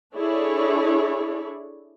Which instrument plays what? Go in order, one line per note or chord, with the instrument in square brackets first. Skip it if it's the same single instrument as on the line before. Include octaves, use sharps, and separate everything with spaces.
[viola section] D4 E4 G#4 A4 C#5 D5